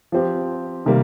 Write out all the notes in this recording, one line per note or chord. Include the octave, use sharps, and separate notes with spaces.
F3 C4 G4
C3 D#3 G3 A#3